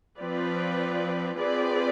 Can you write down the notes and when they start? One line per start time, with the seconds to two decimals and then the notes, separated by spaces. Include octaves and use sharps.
0.19 F3 C4 F4 B4 D5
1.37 C4 F4 G#4 B4 D5